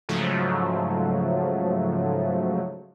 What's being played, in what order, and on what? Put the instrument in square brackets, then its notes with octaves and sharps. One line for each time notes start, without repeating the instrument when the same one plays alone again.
[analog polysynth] G#2 C#3 F3 F#3 A3